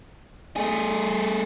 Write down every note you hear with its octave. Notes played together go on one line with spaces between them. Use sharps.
A3 G#4